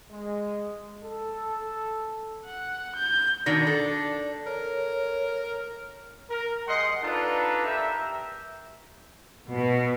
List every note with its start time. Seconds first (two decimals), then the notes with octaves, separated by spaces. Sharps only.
0.11 G#3
1.03 A4
2.45 F#5
2.95 G6
3.46 B2 D#3 D4 D5 A#6 C#7
3.67 A4
4.46 A#4 C#5
6.30 A#4
6.68 G3 G#4 D#5 F#5 C6
7.03 D4 D#4 F4 A4 B4
7.66 G4 A#4 E5
9.50 B2